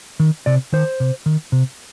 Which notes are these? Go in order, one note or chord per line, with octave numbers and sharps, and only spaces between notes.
D#3
C3 D5
D#3 C5
C3
D#3
C3